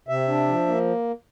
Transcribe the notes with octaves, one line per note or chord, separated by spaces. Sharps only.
C3 E5
D4
F3
A#3